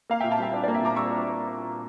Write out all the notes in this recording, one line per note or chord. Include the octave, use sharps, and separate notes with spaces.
A#3 F5
E5 G5
A#2
F5 A5
G3 E5 G5
D4 E5
D5
A#3
E5
A#2 A#5 D6
G3 C#6 E6
D4